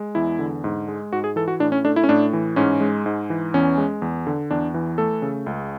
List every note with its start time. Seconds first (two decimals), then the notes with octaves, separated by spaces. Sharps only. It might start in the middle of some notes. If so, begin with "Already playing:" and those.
Already playing: G#3
0.15 E2 E4
0.39 D3
0.64 G#2
0.88 G#3
1.13 G#2 F#4
1.24 G#4
1.36 E3 A4
1.48 F#4
1.60 A2 D4
1.72 C#4
1.85 A3 D4
1.96 E4
2.04 C#4
2.09 A2 D4
2.33 E3
2.56 G#2 C#4
2.81 G#3
3.06 G#2
3.30 E3
3.54 E2 C#4
3.78 G#3
4.02 E2
4.27 D3
4.51 E2 D4
4.74 E3
4.98 A3 A4
5.22 C#3
5.46 C#2